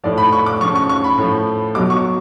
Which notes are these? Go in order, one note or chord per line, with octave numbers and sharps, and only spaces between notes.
A2 F3 D5
B5
C#6
D6
C#3 F3 C#6
C#6
C#6
B5
A2 F3
B2 F#3 D6
C#6